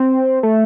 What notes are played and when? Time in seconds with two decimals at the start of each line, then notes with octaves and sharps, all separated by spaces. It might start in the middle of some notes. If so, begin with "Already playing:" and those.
Already playing: C4
0.43 A3